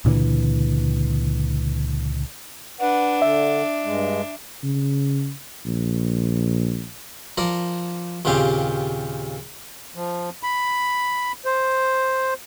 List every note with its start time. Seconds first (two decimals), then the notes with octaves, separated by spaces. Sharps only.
0.05 C#2 A#2 D3 E3
2.81 D4 B4 F#5
3.22 D3 E5
3.84 G2 G#3
4.64 C#3
5.66 A#1
7.38 F3 A#4 D5
8.25 D#2 A#2 C#3 C4 G4 F5
9.95 F3
10.43 B5
11.45 C5